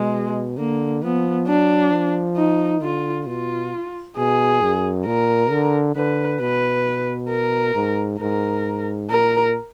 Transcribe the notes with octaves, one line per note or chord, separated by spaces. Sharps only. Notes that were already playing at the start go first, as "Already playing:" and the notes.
Already playing: B2 G#3
D3 A#3
F3 B3
F#3 D4
F3
D#4
D3 F4
B2 F4
B2 G#4
F#2
A#2 A#4
D3
D3 B4
B2 B4
A#4
G#2
G#2 A#4
A#2 A#4